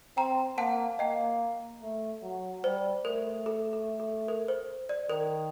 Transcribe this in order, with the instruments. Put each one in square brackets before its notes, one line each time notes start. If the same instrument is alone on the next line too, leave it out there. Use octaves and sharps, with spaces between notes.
[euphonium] C4 [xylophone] G5 A#5
[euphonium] A#3 [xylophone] F#5 A5
[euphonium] A#3 [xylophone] D#5 G5
[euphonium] A3
F#3
[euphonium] G3 [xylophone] C5
[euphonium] A3 [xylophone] A#4
[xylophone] A4
A4
A4
A#4
C5
D5
[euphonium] D#3 [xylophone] A#4